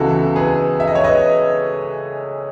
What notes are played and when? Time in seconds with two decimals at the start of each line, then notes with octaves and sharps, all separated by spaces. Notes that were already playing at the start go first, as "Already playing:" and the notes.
Already playing: C#2 C#3 E3 B3 E4 F#4 A4
0.36 G#4 B4
0.80 E5
0.87 D#5
0.95 C#5
1.04 B4 D#5